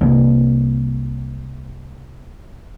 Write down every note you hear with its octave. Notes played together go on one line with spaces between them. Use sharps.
C2 A#3